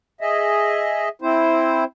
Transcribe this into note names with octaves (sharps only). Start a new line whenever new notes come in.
G#4 D#5 E5
C4 E4 C5